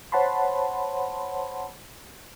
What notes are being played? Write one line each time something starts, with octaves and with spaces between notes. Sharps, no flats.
C5 C#5 F#5 A5 B5 C6